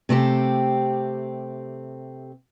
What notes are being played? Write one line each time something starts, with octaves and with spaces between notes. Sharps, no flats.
C3 A3 C4 G4